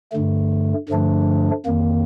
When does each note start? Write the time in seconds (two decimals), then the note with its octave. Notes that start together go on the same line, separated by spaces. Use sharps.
0.12 G2 D3 A3
0.89 G2 D3 F3 A3 D4
1.66 F2 D#3 A#3